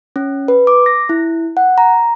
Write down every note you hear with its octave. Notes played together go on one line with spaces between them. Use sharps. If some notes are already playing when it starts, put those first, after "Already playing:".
C#4
B4
D6
A#6
E4
F#5
A#5